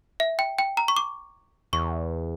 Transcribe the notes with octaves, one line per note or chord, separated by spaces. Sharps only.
E5
G5
G5
A#5
C#6
D6
E2 C#6